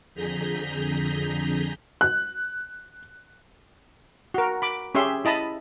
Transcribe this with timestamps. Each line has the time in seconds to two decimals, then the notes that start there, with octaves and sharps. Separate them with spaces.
0.15 F2 D3 G#4 A#5 G6 B6
2.01 F#6
4.34 F#4 A#4
4.62 B5 D6
4.95 C#4 G4 G#4 E5 C6
5.25 E4 D#5 A5 B5